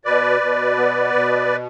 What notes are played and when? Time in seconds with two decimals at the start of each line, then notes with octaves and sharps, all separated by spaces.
0.05 B2 B4 D5
0.41 B2
0.77 B3
1.13 B2